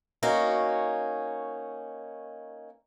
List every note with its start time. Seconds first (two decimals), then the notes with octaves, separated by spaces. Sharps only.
0.23 A#3 C#4 D#4 F#4